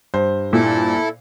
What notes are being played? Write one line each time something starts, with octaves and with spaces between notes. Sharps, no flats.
G2 C5
A#2 E4 A4